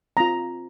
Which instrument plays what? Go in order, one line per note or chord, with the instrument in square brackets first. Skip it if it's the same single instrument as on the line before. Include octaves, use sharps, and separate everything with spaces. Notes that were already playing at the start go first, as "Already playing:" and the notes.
[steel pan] C4 F4 A#5